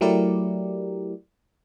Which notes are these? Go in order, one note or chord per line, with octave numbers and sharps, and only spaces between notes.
F#3 A3 E4 G4 A#4 D5